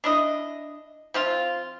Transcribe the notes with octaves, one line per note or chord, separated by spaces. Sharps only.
D4 E4 D#5
F3 C4 F4